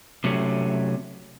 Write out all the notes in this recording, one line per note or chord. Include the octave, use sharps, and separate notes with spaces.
C3 F#3 A3 C#4